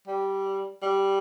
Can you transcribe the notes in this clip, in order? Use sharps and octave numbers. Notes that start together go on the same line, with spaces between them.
G3
G3